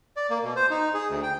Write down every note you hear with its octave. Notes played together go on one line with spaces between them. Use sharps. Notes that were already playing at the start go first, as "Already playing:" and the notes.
D5
A#3
B2
C5
D#4
G#4
D2
G5